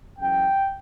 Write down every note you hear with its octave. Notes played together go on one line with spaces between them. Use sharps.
F#2 C#3 E3 G5